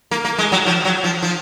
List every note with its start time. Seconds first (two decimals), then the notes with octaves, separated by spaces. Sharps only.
0.11 A#3
0.25 A#3
0.38 G#3
0.52 F#3
0.66 F3
0.85 F#3
1.04 F3
1.23 F3